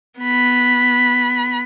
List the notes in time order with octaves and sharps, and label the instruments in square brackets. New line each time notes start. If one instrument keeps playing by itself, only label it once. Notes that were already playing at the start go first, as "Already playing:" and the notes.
[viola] B3 B5